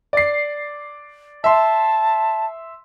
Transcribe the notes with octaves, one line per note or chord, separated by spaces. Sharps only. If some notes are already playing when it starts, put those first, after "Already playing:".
D5 C7
E5 A5 C6